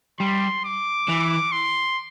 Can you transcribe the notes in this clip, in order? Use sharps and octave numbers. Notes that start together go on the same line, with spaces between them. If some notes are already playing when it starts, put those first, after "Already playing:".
G3 C6
D6
E3
C6